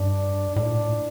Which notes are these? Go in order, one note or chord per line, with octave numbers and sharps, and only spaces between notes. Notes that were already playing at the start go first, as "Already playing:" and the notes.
Already playing: G2 D4
A2 D4
A#2
A2